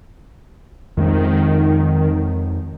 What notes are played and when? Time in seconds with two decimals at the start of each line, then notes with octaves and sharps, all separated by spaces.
0.97 F2 D#3 G#3 C4